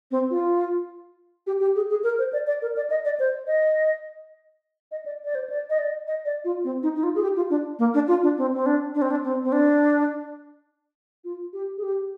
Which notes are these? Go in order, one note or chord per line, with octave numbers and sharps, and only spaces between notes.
C4
F4
G4
G4
G#4
G#4
A#4
C5
D5
D5
A#4
D5
D#5
D5
C5
D#5
D#5
D5
D5
C5
D5
D#5
D5
D#5
D5
F4
C4
D#4
D#4
F4
G#4
G4
F4
D4
A#3
D4
F4
D4
C4
C4
D4
D4
C4
D4
C4
C4
D4
F4
G4
G#4
G4